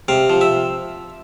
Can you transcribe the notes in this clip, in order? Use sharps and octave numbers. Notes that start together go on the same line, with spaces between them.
C3 F5
F3
E5